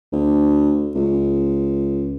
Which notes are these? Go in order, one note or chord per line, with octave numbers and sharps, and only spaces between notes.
D2
C#2